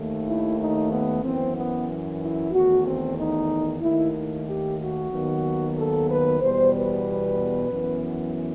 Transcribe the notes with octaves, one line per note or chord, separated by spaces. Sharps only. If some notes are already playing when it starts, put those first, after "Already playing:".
Already playing: D#2 D#3 A3
E4
D#4
B3
F#2 E3 B3 C4
B3
E4
E2 D#3 A3 F#4
C4
D#4
D#2 D#3 A3 E4
G4
F#4
D#2 D#3 F#3 B3
A4
B4
E2 B2 G3 C5
B4
F#2 E3 B3